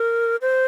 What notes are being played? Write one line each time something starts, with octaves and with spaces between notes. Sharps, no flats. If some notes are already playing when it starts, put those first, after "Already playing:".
Already playing: A#4
C5